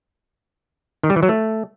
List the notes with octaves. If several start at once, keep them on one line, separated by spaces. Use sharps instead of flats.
D#3
G3
E3
F#3
A3